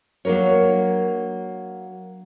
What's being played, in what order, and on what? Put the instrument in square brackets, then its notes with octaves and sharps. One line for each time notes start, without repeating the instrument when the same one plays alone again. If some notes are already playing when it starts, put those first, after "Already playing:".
[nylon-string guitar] F#3 A#3 D4 A#4 C#5